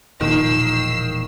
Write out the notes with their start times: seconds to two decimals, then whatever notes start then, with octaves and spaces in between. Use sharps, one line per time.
0.21 E1 A#2 D#3 F3 E6 C7